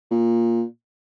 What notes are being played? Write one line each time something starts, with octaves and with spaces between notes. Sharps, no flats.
A#2